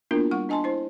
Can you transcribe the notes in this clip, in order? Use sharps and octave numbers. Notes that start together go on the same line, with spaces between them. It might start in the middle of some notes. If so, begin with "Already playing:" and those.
A#3 B3 D4 E4 F4 A#4
G3 F#5 C#6
D4 D#5 G#5 A5 C6
E4 C5